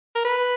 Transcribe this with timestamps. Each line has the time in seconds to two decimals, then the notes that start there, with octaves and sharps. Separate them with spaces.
0.15 A#4
0.25 B4